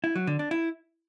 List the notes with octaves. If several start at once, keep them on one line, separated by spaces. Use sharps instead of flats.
E4
F#3
D3
D4
E4